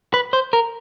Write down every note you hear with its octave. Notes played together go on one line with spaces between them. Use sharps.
B4
C5
A#4